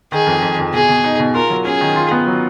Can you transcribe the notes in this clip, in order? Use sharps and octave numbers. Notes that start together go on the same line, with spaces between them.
D#3 G#4
F2
F2
F2
B2 G#4
B2
D#4
B2
F4 A#4
F#3
C#4 G#4
D#3
F4
B3
F#3